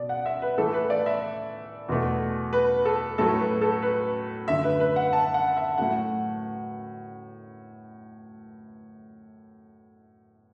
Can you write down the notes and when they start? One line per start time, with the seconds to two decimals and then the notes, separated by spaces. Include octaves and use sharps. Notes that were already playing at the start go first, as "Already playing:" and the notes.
Already playing: B2 D5
0.09 F#5
0.26 E5
0.42 B4
0.58 A2 E3 A3 A4
0.74 B4
0.90 D5
1.06 E5
1.88 E2 B2 A3
2.53 B4
2.85 A4
3.18 A2 F#3 A3 A4
3.40 B4
3.61 A4
3.82 B4
4.48 F#2 D3 A3 E5
4.64 B4
4.80 B4
4.96 F#5
5.13 A5
5.34 F#5
5.57 E5
5.78 A2 F#3 A3 F#5